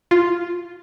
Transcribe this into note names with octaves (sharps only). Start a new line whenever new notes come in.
F4